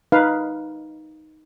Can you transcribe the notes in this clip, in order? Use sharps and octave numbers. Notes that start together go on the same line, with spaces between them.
D#4 B4 F5